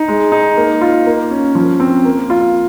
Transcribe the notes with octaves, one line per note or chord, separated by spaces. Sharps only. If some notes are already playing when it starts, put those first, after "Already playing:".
Already playing: D#4
G#3
D#4
A#3
F4
A#3
C#4
F3
C4
A#3
F4